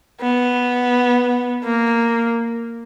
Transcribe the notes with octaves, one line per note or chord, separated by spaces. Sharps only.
B3
A#3